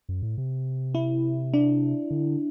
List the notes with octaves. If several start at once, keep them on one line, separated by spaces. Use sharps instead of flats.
F#2
A2
C3
E4
D4
D3